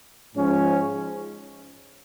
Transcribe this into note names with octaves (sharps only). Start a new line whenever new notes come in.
G#2 F3 G#3 C#4